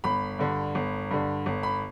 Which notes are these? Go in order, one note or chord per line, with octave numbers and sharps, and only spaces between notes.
G1 B5
G2 D3
G1
G2 D3
G1
B5